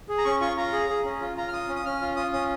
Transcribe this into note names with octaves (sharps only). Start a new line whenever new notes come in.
G#4
A#5
C#4 C#6
F4 C#6
F4 A#5
G#4
G#4
C#4
F4
F4 A#5
F6
F4 D#6
C#4
D#6
C#4 F6
F4
F4 D#6
C#4 D#6